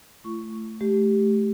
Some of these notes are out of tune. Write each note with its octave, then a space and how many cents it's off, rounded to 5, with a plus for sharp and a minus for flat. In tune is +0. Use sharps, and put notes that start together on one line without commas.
A3 +0 E4 +45 C#6 +5
A3 -30 G4 +0